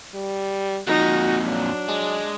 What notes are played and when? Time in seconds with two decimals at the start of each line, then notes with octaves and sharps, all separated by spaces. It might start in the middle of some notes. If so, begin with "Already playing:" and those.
0.14 G3
0.88 F2 A#2 D#4 F#4
1.45 F#3 D4
1.89 G#3